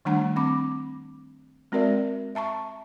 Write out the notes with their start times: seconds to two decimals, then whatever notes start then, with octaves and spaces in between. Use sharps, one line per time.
0.05 D#3 G3 A3 D4 F#5 A#5
0.36 C4 B5 D6
1.72 G#3 C4 F#4 A#4 D5 E5
2.35 E5 A5 A#5 C#6